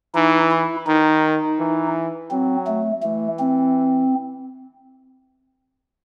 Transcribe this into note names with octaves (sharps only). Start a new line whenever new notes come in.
E3 D#4
E4
D#3 D#4
E3
F#3 C4
A3
E3 A3
C4